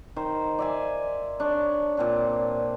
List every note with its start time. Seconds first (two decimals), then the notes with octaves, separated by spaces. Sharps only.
0.16 D#3 C5
0.59 D5 E5 G#5
1.40 D4 C#5
1.97 A#2 C4 D4